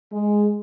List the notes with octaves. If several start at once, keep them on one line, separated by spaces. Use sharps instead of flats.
G#3